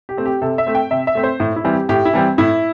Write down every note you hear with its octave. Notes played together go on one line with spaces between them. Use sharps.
G4
A3 C4
G4
C3 A4
E5
A3 C4
G5
C3 E5
E5
A3 C4
C5
A2
E4
E3 G3 C4
G4
A2 G4
E4
E3 G3 C4
A2 E4